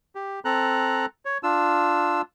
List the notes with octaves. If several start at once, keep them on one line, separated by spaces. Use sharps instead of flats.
G4
C4 A4 A#5 F#6
C#5
D4 F4 E6